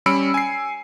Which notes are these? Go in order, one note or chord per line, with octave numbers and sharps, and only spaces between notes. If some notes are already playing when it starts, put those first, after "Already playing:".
G3 C#4 B5 E6 C#7 D7
G#5 C7